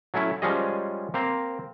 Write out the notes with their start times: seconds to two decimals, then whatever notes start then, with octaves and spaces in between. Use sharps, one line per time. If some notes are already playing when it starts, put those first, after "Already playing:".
0.14 F#3 A3 C#4 E4
0.42 F3 G3 G#3 C#4 G#4 D#5
1.14 A#3 C4 C5 A#5